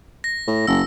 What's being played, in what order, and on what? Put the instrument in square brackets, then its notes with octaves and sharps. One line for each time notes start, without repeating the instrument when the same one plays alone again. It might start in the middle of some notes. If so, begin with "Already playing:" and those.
[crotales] A#6
[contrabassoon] A2
[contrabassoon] F#1 [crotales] E6